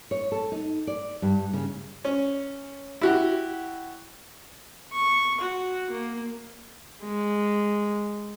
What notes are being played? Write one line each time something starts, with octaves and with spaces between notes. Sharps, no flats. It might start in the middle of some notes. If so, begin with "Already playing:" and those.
C#5
A4
D#4
D5
G2
C#3
C#4
E4 F#4 G4
C#6
F#4
A#3
G#3